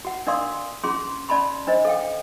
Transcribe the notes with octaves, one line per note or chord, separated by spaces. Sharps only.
F#4 F#5
D4 A#4 D5 F5 C6 D#6
C#4 F4 G#4 C6
C#4 D5 A5 B5 C6
D4 C5 D#5
A4 F5 G5